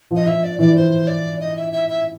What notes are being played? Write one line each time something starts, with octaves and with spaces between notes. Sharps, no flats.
F3
D#5
F3 E5
D5
E3 D5
C5
D5
D#5
E5
E5
E5